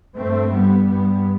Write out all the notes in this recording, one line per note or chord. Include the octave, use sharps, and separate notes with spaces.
G2 A3 C4
G3 B3
G2 G3 B3